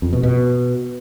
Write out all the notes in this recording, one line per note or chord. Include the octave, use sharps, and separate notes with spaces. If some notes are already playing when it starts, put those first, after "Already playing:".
F2
B2
B2